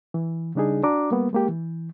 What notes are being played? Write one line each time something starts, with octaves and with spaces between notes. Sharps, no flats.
E3
C#3 G3 D4 D#4 G#4
D4 F#4 D5 A#5 D6
G3 A#3 B3
G#3 A#3 G4
E3